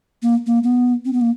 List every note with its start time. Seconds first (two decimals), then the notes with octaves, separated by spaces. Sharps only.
0.22 A#3
0.47 A#3
0.64 B3
1.05 C4
1.13 B3
1.21 A#3